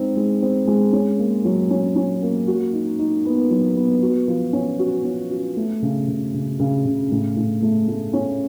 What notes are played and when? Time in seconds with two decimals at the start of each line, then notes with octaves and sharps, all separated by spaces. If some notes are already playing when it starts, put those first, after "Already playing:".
Already playing: G#3 C4 D#4
0.16 G#3
0.42 C4
0.67 G#3
0.93 C#4
1.19 A#3
1.45 F#3
1.71 C#4
1.96 C#4
2.22 A#3
2.47 F#4
2.73 D#4
2.99 D#4
3.25 B3
3.50 F#3
3.76 B3
4.02 F#4
4.28 F3
4.53 C#4
4.79 F#4
5.04 C#4
5.31 F#4
5.57 A3
5.82 C#3
6.08 C#3
6.34 C#3
6.60 C#3
6.85 C#3
7.11 A2
7.36 A2
7.62 A3
7.88 A3
8.13 C#4